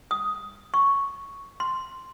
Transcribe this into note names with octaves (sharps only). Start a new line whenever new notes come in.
D#6
C#6
C6